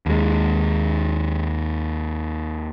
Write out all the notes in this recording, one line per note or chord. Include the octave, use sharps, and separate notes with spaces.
D#2 G#3